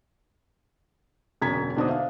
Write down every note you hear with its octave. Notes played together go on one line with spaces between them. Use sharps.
E1 F#2 D3 A#5 G#6 B6
B2 D3 D4 D#4 C5 D#6
E5 F5